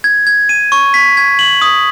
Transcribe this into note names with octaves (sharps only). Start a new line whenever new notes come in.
G#6
G#6
D#7
C#6
B6
G#6
F#7
D#6